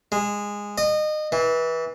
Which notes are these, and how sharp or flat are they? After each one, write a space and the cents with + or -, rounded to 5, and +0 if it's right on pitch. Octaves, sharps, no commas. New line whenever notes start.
G#3 -15
D#5 -25
E3 -25